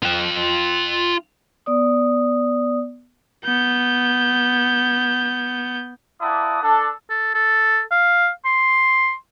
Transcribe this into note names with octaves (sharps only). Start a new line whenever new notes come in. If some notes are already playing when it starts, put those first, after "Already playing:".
F4 G5
B3 D5 D#6
B3 G6
A#3 E4 D5 F#5 A5 D#6
D4 A4
A4
A4
F5
C6